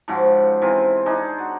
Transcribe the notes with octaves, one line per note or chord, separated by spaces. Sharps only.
G#2 C#3 F3 F#4
C3 E3 F4
D4 D#4 G#4
F#4